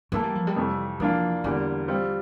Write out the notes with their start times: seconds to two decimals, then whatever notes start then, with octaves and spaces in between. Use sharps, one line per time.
0.12 E3 A3 A#3 E4 A4
0.24 G3
0.35 F3
0.47 G3
0.56 F2 C3 E3 A3
1.00 E3 F3 A#3 D4 F4
1.44 E2 D3 E3 G3 A#3
1.88 G3 C4 F4